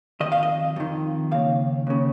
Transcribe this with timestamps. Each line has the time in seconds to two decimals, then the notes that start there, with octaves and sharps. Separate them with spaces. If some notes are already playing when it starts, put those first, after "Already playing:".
0.20 F2 D#3 D#5
0.32 F5
0.43 D#5
0.76 F2 D#3
1.31 D#2 C#3 F5
1.87 D#2 C#3